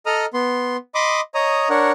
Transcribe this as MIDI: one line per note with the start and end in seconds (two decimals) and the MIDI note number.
0.06 0.26 69
0.06 0.26 75
0.06 0.26 82
0.06 0.26 87
0.06 0.26 89
0.34 0.77 59
0.34 0.77 84
0.95 1.21 75
0.95 1.21 83
0.95 1.21 84
0.95 1.21 86
0.95 1.21 87
1.35 1.69 73
1.35 1.69 75
1.35 1.69 82
1.35 1.69 87
1.70 1.92 62
1.70 1.92 70
1.70 1.92 73
1.70 1.92 78